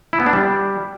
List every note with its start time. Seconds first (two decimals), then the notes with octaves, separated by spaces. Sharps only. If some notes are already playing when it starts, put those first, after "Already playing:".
0.13 E4
0.20 B3
0.26 D4
0.33 G3